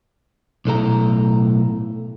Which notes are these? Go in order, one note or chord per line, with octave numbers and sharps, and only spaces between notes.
B1 A2 A4 A#5